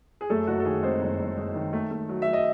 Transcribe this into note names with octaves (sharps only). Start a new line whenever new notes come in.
G#4
F#2 A3 A4
F#1 F#4
A4
D#3 G#4
G#3 C4 C5
F#1
F#1
G#3
D#3
A3
A3
F#3
E5
F#3
D#5